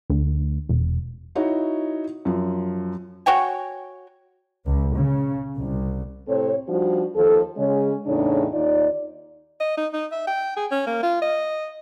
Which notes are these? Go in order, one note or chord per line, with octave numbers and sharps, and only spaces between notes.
D2
E1
D#4 E4 F#4 C#5
F#2 F3
F#4 C#5 G5 G#5
C#2
C#3
C2
A2 C3 C4 A4 C#5
F3 G3 D4 D#4 F#4
D#2 D#3 F3 A4
C#3 G#3 C#4
E2 A2 C#3 D4 D#4 C#5
D#2 D#4 F4 D5
D#5
D#4
D#4
E5
G5
G#4
C#4
A#3
F4
D#5